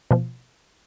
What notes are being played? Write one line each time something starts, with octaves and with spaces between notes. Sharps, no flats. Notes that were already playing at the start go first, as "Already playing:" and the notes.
B2 F3